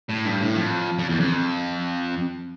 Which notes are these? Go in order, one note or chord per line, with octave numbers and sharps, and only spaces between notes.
A2
G2
A2
F2
F2
E2
F2